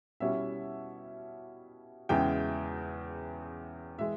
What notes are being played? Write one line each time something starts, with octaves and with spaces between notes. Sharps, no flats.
B2 G3 C#4 E4 E5
E2 C#3 E3 G#3 G5
E3 G#3 E5